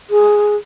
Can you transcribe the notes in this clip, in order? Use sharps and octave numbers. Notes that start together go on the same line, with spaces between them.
G#4